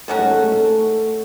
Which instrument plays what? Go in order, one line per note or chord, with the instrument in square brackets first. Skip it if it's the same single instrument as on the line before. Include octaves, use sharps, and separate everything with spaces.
[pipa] D#3 F#3 C#4 F#4 [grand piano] A3
[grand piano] G#3
A3
A3